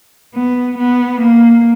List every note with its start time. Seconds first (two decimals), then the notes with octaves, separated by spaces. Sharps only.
0.35 B3
0.78 B3
1.21 A#3